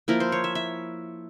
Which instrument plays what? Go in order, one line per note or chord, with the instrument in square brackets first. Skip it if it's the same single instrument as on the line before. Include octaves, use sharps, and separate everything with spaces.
[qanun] F3 A#3 E4 A#4
C5
C#5
E5
E5